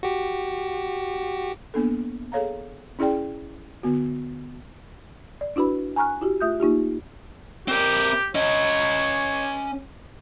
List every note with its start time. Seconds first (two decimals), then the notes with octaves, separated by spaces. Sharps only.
0.03 F#4 G4
1.74 A#3 B3 D4 A4
2.32 G#4 A4 C#5 F5 A#5
2.99 C#4 E4 G#4 D5 G5
3.83 D3 B3 F#4
5.41 D5
5.56 D4 E4 F#4 B4 B5
5.96 G#5 A#5 C#6 F6 F#6
6.21 E4 F#4 G4
6.41 A3 F4 E5 D#6 F#6 G6
6.60 A#3 D#4 F4 G4
7.68 C4 G4 A#4
8.35 C#4 C#5 D#5